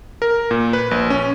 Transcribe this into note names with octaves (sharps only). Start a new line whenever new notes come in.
A#4
A#2
B4
A#1
C#4